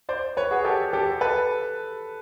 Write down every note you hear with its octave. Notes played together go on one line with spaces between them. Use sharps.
C5 D5
B4 C#5
F#4 G#4
G4 A4
G4 A4
A4 B4